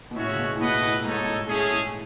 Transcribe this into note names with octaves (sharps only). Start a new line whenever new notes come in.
B2
A2 C#4 F#4 C#5 E5
C#3
B2
A2
B2 E4 B4 D#5 F#5
A2
G#2 D#4 A4 C#5
B2
A2
G#2 A3 C#4 G#4
A2